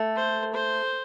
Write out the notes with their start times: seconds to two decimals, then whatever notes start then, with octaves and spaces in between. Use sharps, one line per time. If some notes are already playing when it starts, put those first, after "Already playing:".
Already playing: A3
0.16 C5
0.53 C5